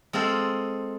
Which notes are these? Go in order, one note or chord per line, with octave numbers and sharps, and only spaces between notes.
G#3 C4 F4 A4